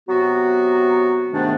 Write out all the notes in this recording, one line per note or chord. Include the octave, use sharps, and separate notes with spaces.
C3 F#3 B3 F#4
G#2 C3 D#3 A3 B3 D4